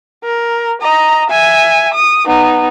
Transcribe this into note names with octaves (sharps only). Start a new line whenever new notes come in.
A#4
D#5 A#5
E5 G#5
D#6
B3 D#4